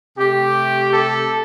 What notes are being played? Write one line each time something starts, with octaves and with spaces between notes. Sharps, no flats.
C3 A3 G4
A4